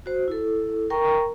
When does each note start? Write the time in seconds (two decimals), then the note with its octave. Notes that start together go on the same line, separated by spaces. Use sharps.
0.06 F#4 C5
0.28 E4 A4
0.90 A#4 G5 A#5 C#6